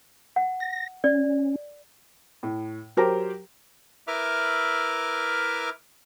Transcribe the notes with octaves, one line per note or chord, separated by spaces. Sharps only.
F#5
A#6
C#4 D5
A2
F#3 G4 A#4 C5 G5 A#5
E4 A#4 B4 E5 D6 F6